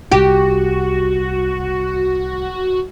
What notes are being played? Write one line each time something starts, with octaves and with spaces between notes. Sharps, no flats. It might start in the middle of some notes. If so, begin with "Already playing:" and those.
C2 F#4 G4